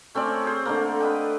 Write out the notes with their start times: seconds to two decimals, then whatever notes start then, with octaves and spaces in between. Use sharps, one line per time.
0.15 A3 C4 C#4 D5
0.43 G#4 C5
0.65 D3 A3 A#3
1.00 B4 D#5 G5